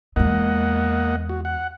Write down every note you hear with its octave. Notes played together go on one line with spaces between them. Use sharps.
E2 G#3 A#3 D#5 F#5
F#4
F#5